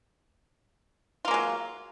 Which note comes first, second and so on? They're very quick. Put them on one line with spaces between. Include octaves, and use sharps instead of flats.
F4 A#3 G#3 F#3